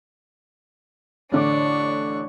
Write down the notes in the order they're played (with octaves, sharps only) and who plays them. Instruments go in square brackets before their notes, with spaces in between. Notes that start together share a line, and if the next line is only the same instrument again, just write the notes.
[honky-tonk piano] A1 D3 D6 [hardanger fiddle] D4 C#6